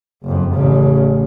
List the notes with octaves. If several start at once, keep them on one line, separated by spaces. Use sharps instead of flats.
F#1 F2
A1 C#3